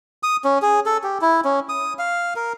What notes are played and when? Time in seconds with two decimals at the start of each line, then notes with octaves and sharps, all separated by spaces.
0.23 D#6
0.44 C#4
0.62 G#4
0.86 A4
1.03 G4
1.21 E4
1.45 C#4
1.69 D#6
1.99 F5
2.36 A#4